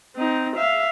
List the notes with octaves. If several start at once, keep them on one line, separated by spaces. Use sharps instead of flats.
C4 D#4
E5 F5